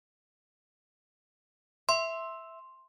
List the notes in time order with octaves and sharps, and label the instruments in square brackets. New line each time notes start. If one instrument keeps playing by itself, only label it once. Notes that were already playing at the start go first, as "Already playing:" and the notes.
[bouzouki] E5 [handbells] C6